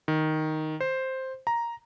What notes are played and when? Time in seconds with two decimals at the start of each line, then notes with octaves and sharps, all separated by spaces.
0.08 D#3
0.81 C5
1.47 A#5